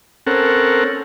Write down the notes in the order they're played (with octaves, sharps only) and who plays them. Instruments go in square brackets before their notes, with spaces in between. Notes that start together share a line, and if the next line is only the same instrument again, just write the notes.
[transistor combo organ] C4 C#4 A4 A#4 F#5